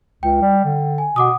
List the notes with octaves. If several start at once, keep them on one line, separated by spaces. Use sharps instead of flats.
C#2 G5
G3
D3
G#5
B2 F#5 D6 D#6